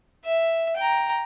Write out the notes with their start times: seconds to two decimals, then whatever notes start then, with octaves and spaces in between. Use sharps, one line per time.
0.25 E5
0.77 G5 A#5